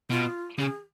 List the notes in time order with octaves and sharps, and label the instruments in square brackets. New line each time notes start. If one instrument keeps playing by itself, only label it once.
[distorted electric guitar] B2 [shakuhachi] F4
[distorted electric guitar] C#3 [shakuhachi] G#4